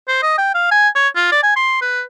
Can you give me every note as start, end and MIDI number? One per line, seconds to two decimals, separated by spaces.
0.08 0.18 72
0.23 0.38 75
0.38 0.50 79
0.55 0.69 77
0.71 0.89 80
0.95 1.08 73
1.16 1.28 65
1.32 1.41 74
1.43 1.54 80
1.56 1.77 84
1.82 2.03 71